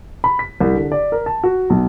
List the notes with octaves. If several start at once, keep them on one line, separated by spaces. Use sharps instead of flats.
B5
B6
C2
D3
D5
A#4
A5
F#4
B1